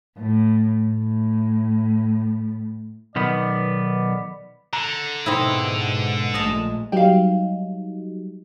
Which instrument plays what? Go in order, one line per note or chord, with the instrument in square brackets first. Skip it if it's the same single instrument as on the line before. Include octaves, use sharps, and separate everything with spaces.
[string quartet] A2
A2
[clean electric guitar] B1 D#3 B3 [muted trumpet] D5
[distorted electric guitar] D3 [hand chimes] A#5
[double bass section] G#2 B2 G#3 [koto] C4 D#4 E4
[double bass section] A#1 G#3 A3 [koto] D#5 A5
[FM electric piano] F#3 G3 D#4 [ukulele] F5 G5